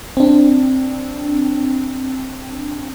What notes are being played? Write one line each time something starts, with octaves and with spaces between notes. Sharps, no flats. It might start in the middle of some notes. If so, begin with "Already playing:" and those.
C4 D4